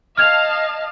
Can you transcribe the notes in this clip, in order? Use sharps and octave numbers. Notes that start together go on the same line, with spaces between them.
D#5 F5 A5 F6 G#6 F7